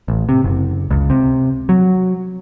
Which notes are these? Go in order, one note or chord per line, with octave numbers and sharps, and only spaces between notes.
A1
C3
F#1
C#2
C3
F#3